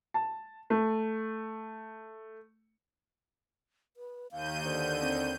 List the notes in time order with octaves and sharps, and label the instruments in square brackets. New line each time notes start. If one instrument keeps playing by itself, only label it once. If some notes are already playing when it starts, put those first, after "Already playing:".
[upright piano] A5
A3
[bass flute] B4
[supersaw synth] D#2 G6 D#7 [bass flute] F5
[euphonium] D3 [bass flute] C5
[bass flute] C4